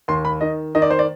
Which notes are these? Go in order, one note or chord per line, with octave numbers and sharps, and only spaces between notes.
D#2 C6
B5
D#3 D#5
D#3 D#5
D5
C5
D5